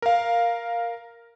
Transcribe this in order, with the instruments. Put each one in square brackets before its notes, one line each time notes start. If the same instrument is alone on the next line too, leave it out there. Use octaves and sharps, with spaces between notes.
[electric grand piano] A#4 F5